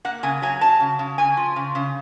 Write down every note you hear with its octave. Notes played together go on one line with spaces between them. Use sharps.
A#3 F#5
C#3 G#5
F#3 G#5
F#3 A5
C#3
C#3
C#3 G#5
F3
C#3
C#3